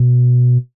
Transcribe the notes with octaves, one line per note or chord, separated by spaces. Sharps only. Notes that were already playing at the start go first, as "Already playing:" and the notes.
Already playing: B2